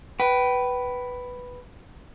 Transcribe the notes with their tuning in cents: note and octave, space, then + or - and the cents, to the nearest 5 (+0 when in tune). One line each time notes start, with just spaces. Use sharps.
B4 +0 G5 -30